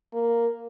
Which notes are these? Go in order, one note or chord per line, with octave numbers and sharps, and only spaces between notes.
A#3